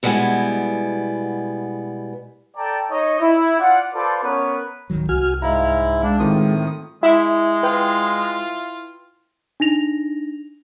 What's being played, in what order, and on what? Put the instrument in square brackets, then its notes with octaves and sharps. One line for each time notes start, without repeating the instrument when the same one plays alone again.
[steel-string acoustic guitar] B2 G3 G#3 B3 E4 G#5
[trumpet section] A4 D5 G5 A5 A#5
D#4 C#5 D#5
E4
F4 D5 F#5
F4 A4 B4 C5 D5
B3 C#4 A#4 B4 C#5
[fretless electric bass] D1 D#3 F#3
[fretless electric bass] C2 [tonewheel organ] F#4 G#5 F6
[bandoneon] G#2 E4 [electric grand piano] D#5 A#5 [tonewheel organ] F5
[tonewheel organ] G#3 [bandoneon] D4 [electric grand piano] F5 G5
[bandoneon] A2 D#6 [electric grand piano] D#3 C4 F4
[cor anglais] G#3 [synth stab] E4
[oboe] F4 [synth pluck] B4 G5
[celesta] D4 D#4 A#6 F7